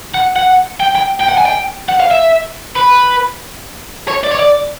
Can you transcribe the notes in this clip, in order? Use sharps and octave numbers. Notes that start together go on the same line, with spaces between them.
F#5
F#5
G5
G5
G5
F#5
G#5
G5
F#5
F5
E5
B4
C#5
D5
C#5
D5